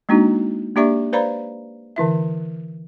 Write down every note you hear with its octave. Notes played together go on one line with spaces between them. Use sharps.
G#3 A#3 D4 D#4 F#4
A#3 D4 G4 D5 E5 C#6
B4 C5 D5 F5 A#5 B5
D3 E3 E4 E5